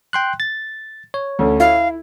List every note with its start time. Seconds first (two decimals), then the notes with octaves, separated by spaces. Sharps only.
0.13 G5 C6 F#6
0.40 A6
1.14 C#5
1.39 D2 D3 C#4
1.60 E4 F5